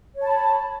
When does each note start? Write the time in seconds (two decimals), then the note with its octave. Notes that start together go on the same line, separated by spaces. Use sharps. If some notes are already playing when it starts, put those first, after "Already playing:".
0.16 C#5
0.21 A5
0.26 B5